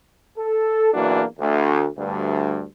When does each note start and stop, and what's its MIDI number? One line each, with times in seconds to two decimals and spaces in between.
0.38 0.92 69
0.93 1.23 35
0.93 1.23 40
0.93 1.23 52
0.93 1.23 58
0.93 1.23 62
0.93 1.23 66
1.39 1.86 38
1.98 2.63 38
1.98 2.63 43